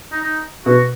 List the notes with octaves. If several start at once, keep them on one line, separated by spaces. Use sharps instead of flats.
D#4
D#4
B2 F#4